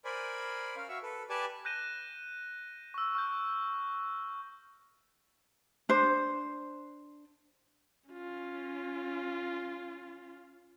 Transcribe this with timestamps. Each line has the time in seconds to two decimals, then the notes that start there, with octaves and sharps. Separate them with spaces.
0.05 A#4 C5 D5 G#5 B5
0.76 C#4 A#4 F5
0.89 F#4 E5 F5 C#6 E6
1.03 A4 B4
1.30 G4 B4 D5 G#5 A5
1.65 F#6 G6 A#6 D#7 E7 G7
2.94 C#6 E6
3.15 C#6 F6 G6
5.89 D4 C5
8.10 C#4 F4